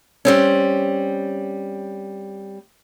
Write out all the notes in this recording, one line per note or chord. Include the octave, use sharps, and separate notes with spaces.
G3 C4 C#4